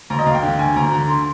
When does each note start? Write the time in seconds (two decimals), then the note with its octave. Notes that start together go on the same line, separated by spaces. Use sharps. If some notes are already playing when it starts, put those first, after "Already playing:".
0.10 D2 A#5
0.19 D#5
0.26 D2 F5
0.34 G5
0.43 D3
0.59 D2 G#5
0.76 D2 A#5
0.92 D3 A#5
1.09 C6